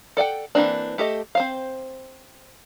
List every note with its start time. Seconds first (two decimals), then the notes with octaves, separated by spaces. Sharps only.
0.17 A4 D5 F#5 G5
0.55 E3 F3 A#3 C4 D4
0.98 A3 G4 A4 D#5
1.35 C4 C5 F5